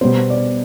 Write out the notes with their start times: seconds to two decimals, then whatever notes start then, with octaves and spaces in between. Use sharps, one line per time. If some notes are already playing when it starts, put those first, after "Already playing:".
0.01 B2 G3 B3 C5
0.30 D5